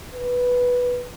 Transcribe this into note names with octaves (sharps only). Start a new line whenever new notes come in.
B4